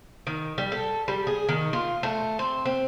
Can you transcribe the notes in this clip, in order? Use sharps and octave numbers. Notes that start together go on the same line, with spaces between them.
D#3
G3
A4
G3
G#4
D#3
F4
A3
C4
C4